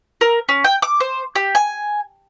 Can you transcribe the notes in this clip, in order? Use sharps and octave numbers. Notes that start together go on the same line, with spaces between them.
A#4
C#4
G5
D6
C5
G4
G#5